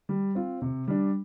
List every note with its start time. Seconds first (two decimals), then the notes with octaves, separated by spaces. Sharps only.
0.09 G3
0.35 C4 F4
0.62 C3
0.88 G3 D4